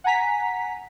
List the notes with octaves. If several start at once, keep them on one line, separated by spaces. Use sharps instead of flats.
F#5 G#5 A#5 B6